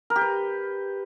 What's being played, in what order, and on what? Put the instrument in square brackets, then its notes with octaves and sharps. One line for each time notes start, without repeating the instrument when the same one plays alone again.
[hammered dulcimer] A#4
G4
B4